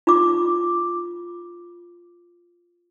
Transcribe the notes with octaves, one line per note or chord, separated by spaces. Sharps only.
F4 D6